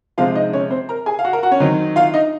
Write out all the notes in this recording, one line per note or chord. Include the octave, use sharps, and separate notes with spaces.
C3 F3 G#3 C4 F4 F5
D#4 D#5
C#4 C#5
C4 C5
A#4 A#5
G#4 G#5
F5
F#4 F#5
A#4 A#5
F#4 F#5
C#4 C#5
D#3 F#3 C4 D#4
F4 F5
D#4 D#5